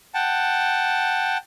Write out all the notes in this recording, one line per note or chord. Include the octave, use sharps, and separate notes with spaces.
F#5 G5 A5